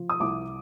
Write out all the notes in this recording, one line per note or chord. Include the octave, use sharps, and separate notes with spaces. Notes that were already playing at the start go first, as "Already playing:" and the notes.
Already playing: F3
D#6
C2 D6